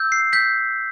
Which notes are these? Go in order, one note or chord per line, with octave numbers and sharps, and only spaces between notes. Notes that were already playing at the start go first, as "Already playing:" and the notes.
Already playing: E6 G6
C7
G6 B6